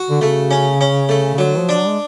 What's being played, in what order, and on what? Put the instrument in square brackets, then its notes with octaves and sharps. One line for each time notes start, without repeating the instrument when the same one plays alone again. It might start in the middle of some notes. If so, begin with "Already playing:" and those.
Already playing: [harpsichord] F#4
[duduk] D3
[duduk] C#3 [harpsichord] A3
[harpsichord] C#4
C#4
A3
[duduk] C#3
[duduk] D3 [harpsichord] F#3
[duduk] F3
[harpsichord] D4
[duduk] F#3
G#3